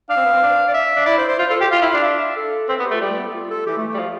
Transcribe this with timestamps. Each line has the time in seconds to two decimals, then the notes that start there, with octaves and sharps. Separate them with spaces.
0.09 D4 F5
0.17 C4
0.25 B3
0.33 C4
0.42 D4
0.68 D5
0.74 E5
0.96 D4
1.06 E4 D5
1.18 C5
1.28 C5
1.39 F4 C5
1.49 F4 A4
1.60 G4 G5
1.71 F4 F5
1.82 E4
1.93 D4
2.04 E5
2.37 A4
2.69 C4 B4
2.76 A4
2.79 B3
2.86 G4
2.91 A3
2.94 F4
3.01 G3
3.10 A3
3.17 B3
3.26 A4
3.34 F4
3.51 A4
3.66 E3 G4
3.78 A3
3.88 A3
3.94 G3
3.99 F3